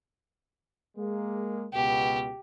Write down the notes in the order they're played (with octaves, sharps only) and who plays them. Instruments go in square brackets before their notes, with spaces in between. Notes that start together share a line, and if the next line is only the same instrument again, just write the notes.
[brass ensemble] G#3 A#3
[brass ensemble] C#2 B2 [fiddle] G4